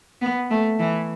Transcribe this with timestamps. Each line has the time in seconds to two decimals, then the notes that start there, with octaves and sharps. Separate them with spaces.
0.22 B3
0.50 A3
0.79 E3